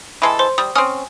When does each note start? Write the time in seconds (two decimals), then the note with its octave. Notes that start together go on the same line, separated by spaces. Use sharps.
0.22 E3 G#3 A4
0.39 C5 C6
0.58 G3 D#6
0.75 C4 C#4 G#5 D#6 F6